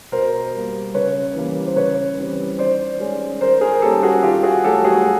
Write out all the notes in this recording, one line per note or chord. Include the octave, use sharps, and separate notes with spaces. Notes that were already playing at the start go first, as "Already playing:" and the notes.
B2 A#4 C5
G3 A#3
C#3 B4 C#5
E3 G3 A#3
C5
C#3 B4 C#5
E3 G3 C4
D#3 C5 D5
G#3 C#4
D#3 A#4 C5
G#4 A#4
G3 A#3 C#4 G4 A4
F#4 G#4
D#3 F4 G4
F#4 G#4
F#3 A3 G4 A4
F#4 G#4